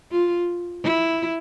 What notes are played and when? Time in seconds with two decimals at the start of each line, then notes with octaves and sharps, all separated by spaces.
0.12 F4
0.84 E4